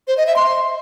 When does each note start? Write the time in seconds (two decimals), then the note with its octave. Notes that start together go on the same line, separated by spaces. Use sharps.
0.08 C5
0.17 D#5
0.27 E5
0.36 C6